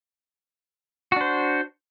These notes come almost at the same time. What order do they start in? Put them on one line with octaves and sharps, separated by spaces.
F#4 D4 C5